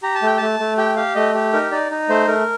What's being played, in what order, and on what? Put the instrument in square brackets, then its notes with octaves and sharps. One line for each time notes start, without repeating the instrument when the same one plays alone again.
[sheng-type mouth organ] G4 A#5
A5
A3 G5
A3 A5
A3
G4 G5
G4 F5
A3 D#5
G4
D#4 A#4
D#4 D5
D#4
A3 C5
A3 A#4